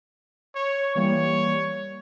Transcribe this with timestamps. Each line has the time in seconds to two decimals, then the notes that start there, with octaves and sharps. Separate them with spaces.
0.55 C#5
0.95 E3 G3 A#3 C#5